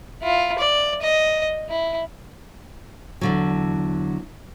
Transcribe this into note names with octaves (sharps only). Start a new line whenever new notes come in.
E4 F4
D5
D#5
E4
E2 D3 F#3